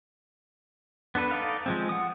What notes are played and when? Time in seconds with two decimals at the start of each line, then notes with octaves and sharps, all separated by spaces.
1.15 B3 D4 A4 B4
1.31 D#4 A4 D5 D#5 F5
1.66 F3 G#3 C4
1.89 F#5 D#6